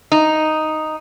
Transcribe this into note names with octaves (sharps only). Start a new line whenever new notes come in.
D#4